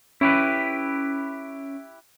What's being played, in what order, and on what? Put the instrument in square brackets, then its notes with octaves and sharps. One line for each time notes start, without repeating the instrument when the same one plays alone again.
[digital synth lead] C#4 [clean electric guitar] E4 G4 B4